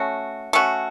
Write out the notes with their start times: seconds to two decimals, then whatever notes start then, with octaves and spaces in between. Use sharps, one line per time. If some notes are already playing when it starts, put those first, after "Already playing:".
Already playing: A3 C#4 F#4
0.53 A3 C#4 F#4